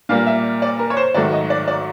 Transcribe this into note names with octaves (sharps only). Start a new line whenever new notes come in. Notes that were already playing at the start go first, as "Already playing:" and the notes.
A#2 G3 A#3 F5
E5
D5
A#4
C#5
C5
G#2 D#3 F#3 A3 D5
D#5
D5
D5